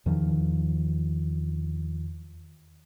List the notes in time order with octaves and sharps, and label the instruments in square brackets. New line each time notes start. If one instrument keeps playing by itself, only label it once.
[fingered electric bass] E2 D#3 F3